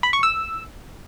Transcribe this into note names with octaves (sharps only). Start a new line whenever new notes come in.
B5
C#6
E6